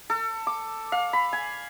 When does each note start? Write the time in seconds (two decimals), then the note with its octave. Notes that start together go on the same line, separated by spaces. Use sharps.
0.10 A4
0.47 D6
0.92 F5
1.13 B5
1.33 G#5